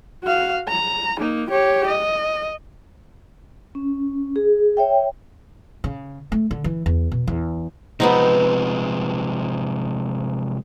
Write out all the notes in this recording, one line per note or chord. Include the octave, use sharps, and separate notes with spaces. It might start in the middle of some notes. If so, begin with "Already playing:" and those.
F#4 F5
A#5
A#3 D#4
G4 C#5
D#5
C#4
G#4
C#5 E5 G5
C#3
A3
D3
E3
E2
B2
E2
C3 F3 G#3 B3 C4 D#4